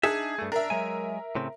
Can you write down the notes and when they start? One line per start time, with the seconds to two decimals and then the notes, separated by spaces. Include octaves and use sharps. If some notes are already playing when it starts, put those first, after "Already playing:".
0.03 D4 D#4 G#4 E5
0.39 G2 A3
0.52 D4 A#4 E5
0.70 F#3 G#3 G#5
1.35 A2 C#3 C4